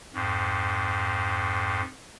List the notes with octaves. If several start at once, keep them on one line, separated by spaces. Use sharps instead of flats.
F2 G#2